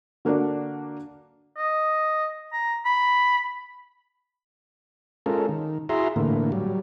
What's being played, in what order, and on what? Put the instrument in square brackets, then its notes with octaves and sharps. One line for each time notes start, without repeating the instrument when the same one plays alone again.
[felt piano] D3 A#3 D4 F#4 D5
[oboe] D#5
A#5
B5
[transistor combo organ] G#3 C#4 F4 A4 A#4
D#3
E4 F#4 G#4 E5 A#5 C6
A2 D3 E3 A#3
F#3 G3